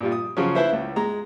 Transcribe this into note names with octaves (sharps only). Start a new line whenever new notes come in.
A#2 G3 F4
D#6
C#3 F3 F#3 C#4
E4 B4 C5 E5
C#2
G#3 A#5